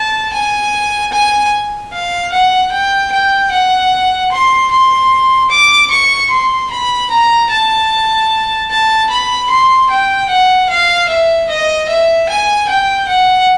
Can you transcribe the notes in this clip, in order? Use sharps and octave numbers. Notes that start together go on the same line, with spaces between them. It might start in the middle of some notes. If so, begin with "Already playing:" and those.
Already playing: A5
G#5
G#5
F5
F#5
G5
G5
F#5
C6
C6
D6
C#6
C6
B5
A#5
A5
A5
B5
C6
G5
F#5
F5
E5
D#5
E5
G#5
G5
F#5